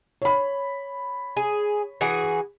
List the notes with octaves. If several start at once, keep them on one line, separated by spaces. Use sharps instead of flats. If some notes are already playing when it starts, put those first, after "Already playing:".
C#5 B5
G#4
E3 F#4 G#4